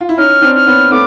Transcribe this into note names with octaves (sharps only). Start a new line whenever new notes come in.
F4
E4
C#4 D#4 F6
C4 D4
F6
B3 C#4
A3 B3 D6